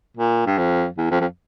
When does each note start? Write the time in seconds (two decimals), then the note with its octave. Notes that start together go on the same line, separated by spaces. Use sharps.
0.17 A#2
0.46 G2
0.58 F2
0.98 E2
1.11 F2
1.21 F2